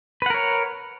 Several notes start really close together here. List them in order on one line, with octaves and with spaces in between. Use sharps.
B4 F#5 A#4 C#5